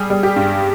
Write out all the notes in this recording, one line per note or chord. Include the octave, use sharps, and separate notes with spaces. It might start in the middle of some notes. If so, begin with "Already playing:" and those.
Already playing: G3 G#4
G3
G4
G2